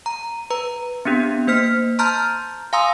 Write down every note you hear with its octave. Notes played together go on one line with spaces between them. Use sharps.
A#5
B4 A#5
B3 C4 D4 G4
A#3 C5 F6 B6
A5 A#5 C6 F6 G6 A6
F5 G#5 A#5 C6 D#6 E6